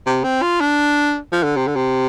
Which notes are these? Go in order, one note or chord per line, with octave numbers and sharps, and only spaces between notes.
C3
C4
F4
D4
F3
D3
C3
D3
C3